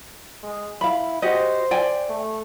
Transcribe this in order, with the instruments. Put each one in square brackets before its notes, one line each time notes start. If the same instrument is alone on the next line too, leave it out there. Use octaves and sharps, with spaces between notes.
[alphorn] G#3
[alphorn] E4 [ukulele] F5 B5
[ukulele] F#4 G4 D#5 [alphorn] C5
[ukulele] D5 G5 G#5
[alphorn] A3